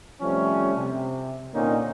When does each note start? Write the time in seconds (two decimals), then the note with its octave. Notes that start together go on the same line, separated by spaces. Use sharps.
0.21 C3 F3 G3 A3 C#4
0.76 C3
1.54 A#2 D3 A#3 C4 C#4 D#4